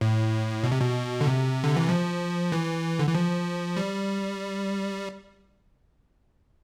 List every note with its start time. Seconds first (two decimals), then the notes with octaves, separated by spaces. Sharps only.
0.01 A2
0.63 B2
0.72 C3
0.80 B2
1.21 D3
1.27 C3
1.64 D3
1.77 E3
1.89 F3
2.52 E3
2.99 D3
3.07 E3
3.15 F3
3.77 G3